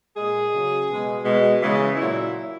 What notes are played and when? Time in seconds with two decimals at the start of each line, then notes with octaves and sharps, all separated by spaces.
0.17 A#2 G#3 G#4
0.53 C#3 F#3
0.89 B2 G#3
1.25 B2 G#3
1.61 C#3 E3 G#3
1.97 A#2 F#3 E4